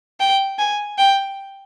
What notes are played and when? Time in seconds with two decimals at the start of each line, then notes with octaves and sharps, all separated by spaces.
0.20 G5
0.58 G#5
0.98 G5